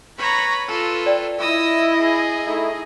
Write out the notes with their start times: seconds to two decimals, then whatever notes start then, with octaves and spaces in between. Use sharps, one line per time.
0.18 B4 C#5 A#5 B5
0.68 F4 A4 B4
1.06 D5 G5
1.39 E4 D#5 D#6 E6
2.00 G#4
2.46 A3 D#4 E4